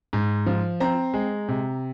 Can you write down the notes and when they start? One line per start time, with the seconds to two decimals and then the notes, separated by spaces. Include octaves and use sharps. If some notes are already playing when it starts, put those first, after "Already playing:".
0.13 G#2
0.46 F3
0.80 C4 A#5
1.14 G#3
1.48 C3